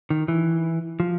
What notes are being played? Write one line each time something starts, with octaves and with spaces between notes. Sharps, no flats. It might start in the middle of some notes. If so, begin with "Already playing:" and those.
D#3
E3
F3